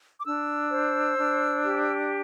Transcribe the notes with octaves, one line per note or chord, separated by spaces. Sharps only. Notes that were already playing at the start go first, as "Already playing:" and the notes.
D6
D4 E6
C5
D4
G4